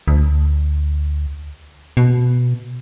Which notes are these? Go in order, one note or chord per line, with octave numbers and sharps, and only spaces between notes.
D2
B2